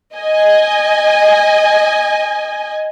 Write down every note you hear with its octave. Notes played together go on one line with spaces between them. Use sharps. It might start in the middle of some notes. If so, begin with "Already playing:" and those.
D#5 G#5